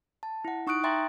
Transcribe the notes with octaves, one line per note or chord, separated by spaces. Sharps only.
A5
E4 F#5
D#4 C#6 D#6 F#6 D7
E5 G5 A#5 C6 A6